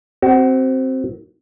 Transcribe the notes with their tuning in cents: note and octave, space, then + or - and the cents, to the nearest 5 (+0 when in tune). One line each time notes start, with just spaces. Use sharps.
C4 +0 F#4 +30